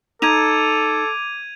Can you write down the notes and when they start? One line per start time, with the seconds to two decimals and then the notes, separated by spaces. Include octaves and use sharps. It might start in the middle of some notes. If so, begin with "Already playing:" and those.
0.22 D#4 A4 D6 G#6 D#7 F7